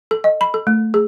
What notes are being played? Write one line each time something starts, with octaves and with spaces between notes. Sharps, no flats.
A4
D#5
B5
A4
A3
G#4